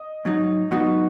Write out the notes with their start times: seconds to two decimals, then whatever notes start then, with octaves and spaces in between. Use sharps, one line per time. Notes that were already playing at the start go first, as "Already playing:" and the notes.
Already playing: D#5
0.25 G#2 F#3 D#4
0.71 G#2 F#3 B3 D#4 F#4